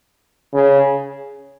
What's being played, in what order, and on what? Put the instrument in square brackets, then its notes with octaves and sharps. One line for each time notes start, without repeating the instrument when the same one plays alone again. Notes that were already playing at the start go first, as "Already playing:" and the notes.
[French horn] C#3